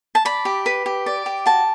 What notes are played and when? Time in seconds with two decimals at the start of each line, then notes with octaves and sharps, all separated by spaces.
0.15 A5
0.25 D5 B5
0.45 G4
0.66 B4
0.86 G4
1.06 D5
1.26 G4
1.46 F#4 A5